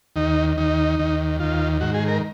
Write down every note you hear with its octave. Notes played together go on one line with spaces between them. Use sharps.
D#2 D#3 D#4
D#2 D#3 D#4
D#2 D#3
D#2 D#3 F4
G#2 D#3 F#4
G#4
A#4